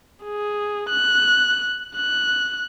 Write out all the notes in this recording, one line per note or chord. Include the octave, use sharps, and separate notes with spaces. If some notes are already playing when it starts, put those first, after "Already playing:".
G#4
F#6
F#6